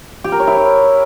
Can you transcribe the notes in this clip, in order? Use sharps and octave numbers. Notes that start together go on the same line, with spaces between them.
G4
A#4
C#5
E4